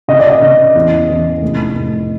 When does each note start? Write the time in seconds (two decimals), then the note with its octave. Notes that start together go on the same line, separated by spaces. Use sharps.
0.08 C#3 D#5
0.19 D5
0.30 D#5
0.42 C#3
0.75 E2
1.09 E3
1.42 F1
1.76 F1